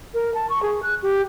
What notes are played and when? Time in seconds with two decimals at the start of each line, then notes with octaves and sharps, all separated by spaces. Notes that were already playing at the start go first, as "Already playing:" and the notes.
0.14 A#4
0.34 A5
0.49 C#6
0.62 G#4
0.83 F#6
1.03 G4